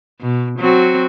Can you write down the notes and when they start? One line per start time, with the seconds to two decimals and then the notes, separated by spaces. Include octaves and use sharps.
0.21 B2
0.59 F#3 C4 F#4